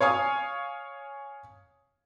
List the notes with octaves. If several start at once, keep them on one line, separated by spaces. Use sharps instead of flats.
C#5 F5 G#5 D#6